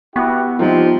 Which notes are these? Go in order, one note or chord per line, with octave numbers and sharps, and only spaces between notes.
B3 E4 F#4 G4 C#6
C3 F3 G3 C4 D#4 F4